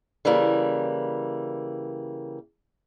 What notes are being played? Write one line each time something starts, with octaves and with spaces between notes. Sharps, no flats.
C#3 E3 G3 A#3